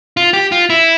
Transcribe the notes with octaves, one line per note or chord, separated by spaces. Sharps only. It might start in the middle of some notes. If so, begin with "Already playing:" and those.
F4
G4
F4
E4